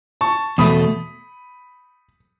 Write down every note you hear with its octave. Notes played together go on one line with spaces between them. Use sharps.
A5 C#6
E2 B2 A3 B5 D#6